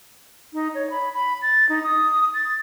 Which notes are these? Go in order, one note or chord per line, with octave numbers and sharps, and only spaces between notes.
D#4
C#5
B5
B5
A6
D#4
D#6
A6